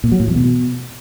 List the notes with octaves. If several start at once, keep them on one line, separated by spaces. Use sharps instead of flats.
A#2
F#3
A2
E2
B2